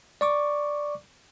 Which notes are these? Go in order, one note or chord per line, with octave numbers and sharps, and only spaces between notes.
D5 C#6 D6